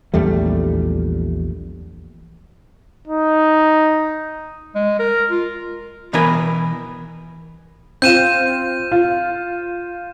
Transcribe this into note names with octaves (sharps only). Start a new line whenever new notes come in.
A#1 E2 G3 A3
D#4
G#3
A#4
F4
B2 E3 B3 A#4 B4 G#5
C4 F4 G6 D#7 E7
F4